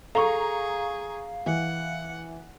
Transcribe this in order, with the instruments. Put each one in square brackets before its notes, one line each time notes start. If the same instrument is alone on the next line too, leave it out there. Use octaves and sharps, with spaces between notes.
[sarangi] G#4 [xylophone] A4 [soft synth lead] F5 [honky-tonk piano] A#5 C#6
[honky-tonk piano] E3 [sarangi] F#5